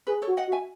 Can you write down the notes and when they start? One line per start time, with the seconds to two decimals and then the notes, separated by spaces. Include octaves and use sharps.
0.07 G#4 B4
0.22 A4 C#5
0.28 F#4
0.37 D#5 F#5
0.48 F#4
0.52 E5 G#5